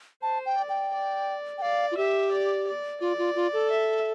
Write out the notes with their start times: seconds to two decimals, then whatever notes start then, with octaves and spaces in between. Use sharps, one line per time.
0.22 C5 A5
0.46 G5
0.57 D5
0.69 G5
0.93 D5
1.58 G5
1.61 D5 F5
1.91 F4
1.97 G4 E5
2.31 D5
2.67 D5
3.01 F4 D5
3.18 F4
3.35 F4
3.53 A4
3.70 E5